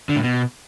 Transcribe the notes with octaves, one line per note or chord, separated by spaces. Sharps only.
D3
A2
B2